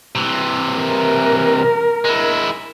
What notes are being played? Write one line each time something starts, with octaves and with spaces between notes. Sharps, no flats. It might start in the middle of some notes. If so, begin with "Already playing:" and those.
C3 E3
A#4
G#3 E4